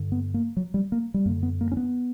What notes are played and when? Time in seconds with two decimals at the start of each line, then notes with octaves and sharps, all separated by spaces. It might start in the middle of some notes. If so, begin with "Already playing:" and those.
Already playing: G2 D3
0.12 B3
0.34 A#3
0.57 F#3
0.74 G3
0.92 A#3
1.14 G3
1.25 F#2 A#3
1.29 D3
1.43 B3
1.61 A#3
1.72 C#4
1.77 B3